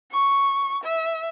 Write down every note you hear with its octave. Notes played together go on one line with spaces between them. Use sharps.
C#6
E5